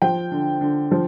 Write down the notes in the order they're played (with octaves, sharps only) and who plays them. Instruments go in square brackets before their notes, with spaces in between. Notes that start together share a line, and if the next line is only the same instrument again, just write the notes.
[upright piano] F3 G5
D3
D3
F3